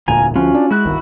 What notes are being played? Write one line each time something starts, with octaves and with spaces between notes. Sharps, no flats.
E1 D2 A#2 F4 G#5 A#5
D2 F3 C#4 F4 F#4
D4
G#3 E4 F#4 F#6
G1 C2 D#3